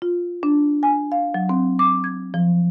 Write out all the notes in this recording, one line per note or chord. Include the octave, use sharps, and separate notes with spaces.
F4
D4
G#5
F5
F#3
C4
D6
G#6
F3